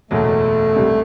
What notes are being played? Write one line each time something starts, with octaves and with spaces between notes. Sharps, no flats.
F#1 E2 B2 F#3 A3
C2 C3 G3 D4